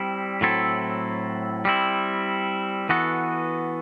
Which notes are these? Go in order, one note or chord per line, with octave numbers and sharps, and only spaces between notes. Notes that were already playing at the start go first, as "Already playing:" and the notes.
Already playing: G3 C4 E4
A2 F#3 C4 E4 A4
G3 C4 E4
E3 B3 F#4 A4